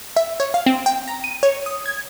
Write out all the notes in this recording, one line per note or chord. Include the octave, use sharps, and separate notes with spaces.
E5
C#5
F5
C4
G5
A#5
D#7
C#5
D#6
G#6